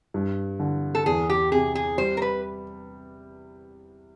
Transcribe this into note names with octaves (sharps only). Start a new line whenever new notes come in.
G2
D3
A4
E2 G#4
G4
C3 G#4
G#4
G3 C5
A#4
B4